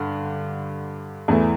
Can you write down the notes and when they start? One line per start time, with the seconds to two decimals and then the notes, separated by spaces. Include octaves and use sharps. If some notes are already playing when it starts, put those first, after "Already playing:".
Already playing: G2 D3
1.28 E2 E3 A3